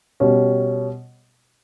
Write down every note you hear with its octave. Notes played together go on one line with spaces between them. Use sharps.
B2 G3 C#4